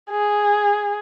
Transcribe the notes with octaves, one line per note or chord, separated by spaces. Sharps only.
G#4